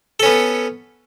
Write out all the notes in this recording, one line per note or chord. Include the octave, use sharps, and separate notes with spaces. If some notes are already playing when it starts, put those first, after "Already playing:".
B3 C#4 A4